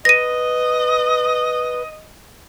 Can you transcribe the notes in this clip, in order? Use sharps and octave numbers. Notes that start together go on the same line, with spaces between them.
B4 D#5 A#6 D#7